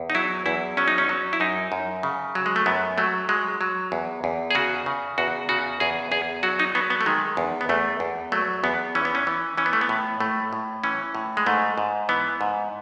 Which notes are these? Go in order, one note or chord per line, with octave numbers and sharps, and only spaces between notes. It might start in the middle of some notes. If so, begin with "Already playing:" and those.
Already playing: E2
D#4
F#3 E4
E2 E4
F#3 C#4
D#4
C#4
F#3
E4
F#2 D#4
F#2
C#3
F#3
G#3
A3
F#2 B3
F#3 A3
F#3 G#3
F#3
E2
E2
G#4
C#3 F#4
C#3
E2 F#4
C#3 F#4
E2 G#4
E2 G#4
F#3 F#4
D#4
F#3 B3
B3
A3
D#3 G#3
E2
B3
E2 A3
E2
F#3 A3
E2 B3
E3 C#4
B3
C#4
E3
E3 C#4
B3
A3
B3
A2
A2 A3
A2
E3 C#4
A2
G#3
G#2 A3
G#2
E3 B3
G#2